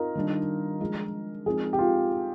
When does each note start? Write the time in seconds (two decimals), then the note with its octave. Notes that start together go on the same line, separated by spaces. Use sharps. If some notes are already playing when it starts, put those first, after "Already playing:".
Already playing: D#4 F4 A#4
0.15 D#3 G3 D4
0.80 F3 G#3 D4
1.46 F3 G#3 C4 D#4 G#4
1.73 G4
1.79 F4